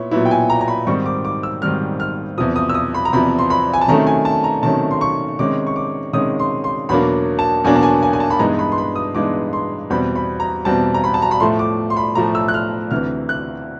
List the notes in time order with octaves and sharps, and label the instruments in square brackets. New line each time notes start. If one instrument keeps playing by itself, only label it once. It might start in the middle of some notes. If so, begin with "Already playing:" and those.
Already playing: [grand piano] A#2 B3 E4 C#5
A#2 F#3 B3 E4
G5
G#5
A#5
A#5
B5
G#2 D#3 G3 C4 C#6
D6
D6
E6
G#2 D#3 G3 C4 F6
F6
E2 C3 F3 D#6
D#6
E6
D#6
B5
A#5
E2 C3 F3 B5
C6
B5
G#5
A5
C3 D#3 F#3 A3 C#4 A#5
G#5
A5
A#5
C3 D#3 F#3 A3 C#4 A5
C6
C#6
C3 D#3 G#3 C#4 D6
C#6
D6
C3 D#3 G#3 C#4 D#6
C6
C6
E2 B2 F#3 A#3 D4 B5
A5
E2 B2 F#3 A#3 D4 G#5
A5
G#5
G#5
G#5
A5
B5
G2 E3 G#3 B3 D#4 A#5
B5
C6
B5
D#6
G2 E3 G#3 B3 D#4 D6
C6
E2 B2 G3 C4 B5
B5
A#5
E2 B2 G3 C4 A5
A#5
B5
A5
A#5
B5
A2 F3 A3 C6
D6
C6
B5
A2 F3 A3 A#5
E6
F#6
F6
D2 C3 E3 F6
F#6